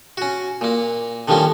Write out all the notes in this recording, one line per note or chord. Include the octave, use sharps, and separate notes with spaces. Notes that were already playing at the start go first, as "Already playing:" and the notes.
C#4 F#4
A#2 A#3
D3 D#3 F3 G3 A#3 C#4